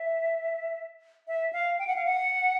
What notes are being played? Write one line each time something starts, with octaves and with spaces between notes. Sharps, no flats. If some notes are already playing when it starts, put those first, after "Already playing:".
Already playing: E5
E5
F5
G5
F#5
F5
F#5